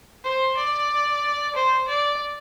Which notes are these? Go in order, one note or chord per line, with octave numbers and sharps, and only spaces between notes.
C5
D5
C5
D5